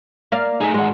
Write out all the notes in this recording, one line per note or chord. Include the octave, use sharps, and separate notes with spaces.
A#3 D5 F5
A3 D#4 G#4 E5
G#2 G#3 F#4